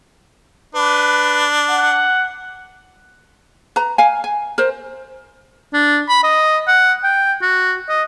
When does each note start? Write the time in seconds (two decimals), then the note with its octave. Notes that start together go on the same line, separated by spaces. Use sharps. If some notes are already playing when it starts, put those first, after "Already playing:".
0.75 D4 B4
1.69 F#5
3.76 B4 A#5
3.98 F5 G#5
4.24 G#5
4.58 A#4 C5
5.73 D4
6.09 B5
6.23 D#5
6.67 F#5
7.04 G5
7.42 F#4
7.89 D#5